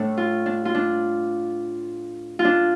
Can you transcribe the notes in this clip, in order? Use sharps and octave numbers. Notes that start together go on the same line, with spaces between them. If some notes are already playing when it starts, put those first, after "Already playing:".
Already playing: A2 A3 D4
F4
D4
F4
D4
F4
D4